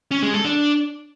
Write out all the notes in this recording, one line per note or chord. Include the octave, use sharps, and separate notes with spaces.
C#4
G#3
A4
D4